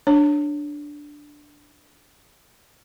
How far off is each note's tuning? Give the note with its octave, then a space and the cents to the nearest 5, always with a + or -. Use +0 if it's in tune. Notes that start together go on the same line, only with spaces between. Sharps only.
D4 +0 C#5 +0